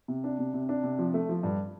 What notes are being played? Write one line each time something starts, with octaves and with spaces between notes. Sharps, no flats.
C3
D4
C3
C3
D4
C3
F3
A3
F3
G2